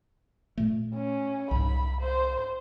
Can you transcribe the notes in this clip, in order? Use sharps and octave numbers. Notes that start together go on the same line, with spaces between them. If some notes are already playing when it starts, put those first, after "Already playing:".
A#2 A3
C#4
C2 G#2 B5
C5